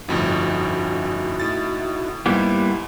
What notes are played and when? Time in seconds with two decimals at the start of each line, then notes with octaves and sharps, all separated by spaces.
0.08 G1 F2 A2 C#4 D#4 E4 F#4
1.40 A2 A6
2.26 G#2 G3 A#3 B3 E4